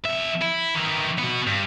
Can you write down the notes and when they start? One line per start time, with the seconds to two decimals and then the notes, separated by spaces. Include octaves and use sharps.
0.05 F2 E5
0.41 E4
0.75 D#3 E3
1.18 B3 F#4
1.47 G2